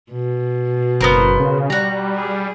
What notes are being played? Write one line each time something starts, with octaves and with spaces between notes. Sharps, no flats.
B2
F#1 B3 A#4 C5
C#3
G3 F#4 A#5
G#4